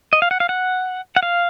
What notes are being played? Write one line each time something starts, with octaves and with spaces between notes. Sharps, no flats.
D#5
F5
F#5
F5
F#5
F#5
F5